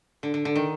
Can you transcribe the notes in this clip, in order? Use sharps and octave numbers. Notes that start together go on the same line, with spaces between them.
D3
D3
D3
D#3